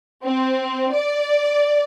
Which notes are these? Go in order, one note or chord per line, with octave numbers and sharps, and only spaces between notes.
C4
D5